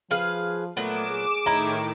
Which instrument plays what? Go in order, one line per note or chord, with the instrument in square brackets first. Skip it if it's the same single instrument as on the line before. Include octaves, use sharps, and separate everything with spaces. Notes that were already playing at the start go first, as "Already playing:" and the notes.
[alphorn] F3 [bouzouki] G#4 B4 F5
[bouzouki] A#2 F#3 B3 [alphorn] A3 [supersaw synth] D6 D7 E7
[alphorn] G#4
[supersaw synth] A2 D#3 [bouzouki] C#4 D#4 E4 [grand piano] A#5